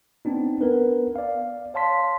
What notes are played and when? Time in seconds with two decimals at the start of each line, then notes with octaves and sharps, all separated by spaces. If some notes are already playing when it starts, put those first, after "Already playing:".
0.25 B3 C4 D4 D#4
0.61 B3 A#4 B4
1.16 D5 F5
1.74 C#5 F5 A5 C6 B6